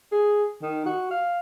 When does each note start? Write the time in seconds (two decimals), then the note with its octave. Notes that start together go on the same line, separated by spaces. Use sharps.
0.12 G#4
0.62 D#3
0.86 F#4
1.11 F5